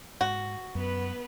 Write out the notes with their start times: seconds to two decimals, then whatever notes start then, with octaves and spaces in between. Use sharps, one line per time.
0.21 G#2 F#4
0.75 F#2 B3 B4